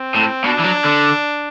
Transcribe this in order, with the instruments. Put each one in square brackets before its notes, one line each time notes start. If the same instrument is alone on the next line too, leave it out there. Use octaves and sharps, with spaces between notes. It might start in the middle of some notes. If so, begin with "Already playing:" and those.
Already playing: [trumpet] C4
[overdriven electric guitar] A2
[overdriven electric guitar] B2 [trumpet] D4
[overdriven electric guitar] E3
F#3
D3